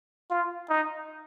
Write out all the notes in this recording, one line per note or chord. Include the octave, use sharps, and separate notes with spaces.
F4
D#4